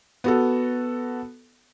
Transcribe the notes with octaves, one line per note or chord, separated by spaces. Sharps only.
B3 F#4 A4